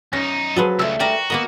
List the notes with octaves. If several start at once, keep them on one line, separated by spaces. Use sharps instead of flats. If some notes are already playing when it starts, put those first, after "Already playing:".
F#2 C#4 D#4 A#6
F3 F#3 G#4 A4 B4
C#2 G2 A3 E6
F#4 A#4 B4 D5 G5
A#3 B3 A#4 D#5